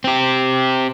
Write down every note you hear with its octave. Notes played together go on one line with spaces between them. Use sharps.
C4 G4